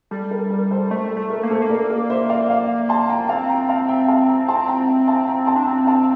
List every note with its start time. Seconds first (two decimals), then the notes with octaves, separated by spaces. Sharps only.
0.11 G3 A4
0.31 A#4
0.50 A#4
0.71 A4 C5
0.90 A3 A4 C5
1.11 A4
1.17 A3
1.30 A#4
1.43 A#3
1.50 A3 A4 C5
1.62 A#3
1.70 A#4 D5
1.90 A#4 D5
2.10 C5 E5
2.29 D5 F5
2.50 D5 F5
2.89 A5 C6
3.09 G5 A#5
3.29 C4 F5 A5
3.49 G5 A#5
3.69 F5 A5
3.88 E5 G5
4.08 F5 A5
4.28 G5 A#5
4.48 A5 C6
4.68 G5 A#5
4.87 E5 G5
5.08 F5 A5
5.28 G5 A#5
5.47 A5 C6
5.56 D4
5.67 C4 G5 A#5
5.87 F5 A5